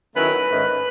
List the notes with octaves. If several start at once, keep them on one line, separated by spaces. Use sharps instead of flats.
D#3 F#3 A3 C#4 E4 B4
G#2 D#3 A3 C#4